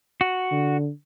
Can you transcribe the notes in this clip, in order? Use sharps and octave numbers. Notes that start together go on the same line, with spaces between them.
F#4
D3